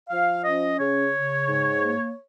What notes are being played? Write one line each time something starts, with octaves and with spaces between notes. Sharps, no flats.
F3 F5
C#4 D#5
C#3 C#5
C#3
G#2
A#3